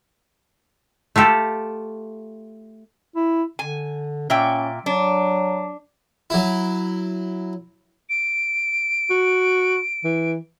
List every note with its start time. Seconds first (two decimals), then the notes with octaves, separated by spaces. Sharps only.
1.16 A3 F4 G4 A4
3.16 E4
3.59 D3 G#5
4.30 A#2 C#4 E5 G5
4.86 F#3 D4
6.30 F#3 E4
8.09 D7
9.10 F#4
10.04 E3